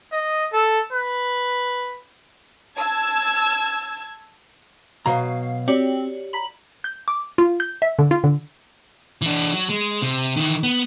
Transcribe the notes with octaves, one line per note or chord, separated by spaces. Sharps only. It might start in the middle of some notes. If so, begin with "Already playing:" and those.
D#5
A4
B4
A5 E6 G#6
B2 F#3 F5 A#5
C4 F#4 G4 C#5 D5
A#5 B5 B6 F#7
G6
D6
F4
G6
E5
D3
F4
D3
E3 D4
F#3
G#3
C3
D#3 E3
B3